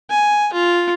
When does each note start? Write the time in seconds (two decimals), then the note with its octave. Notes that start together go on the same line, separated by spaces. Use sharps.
0.10 G#5
0.53 F4